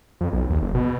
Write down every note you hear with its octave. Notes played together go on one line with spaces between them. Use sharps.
F2
B1
D#2
F#1
B2